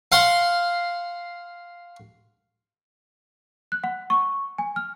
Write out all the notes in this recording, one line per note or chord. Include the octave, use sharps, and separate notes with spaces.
F5 F#5 C6
F#6
F#5
C#6
G#5
F6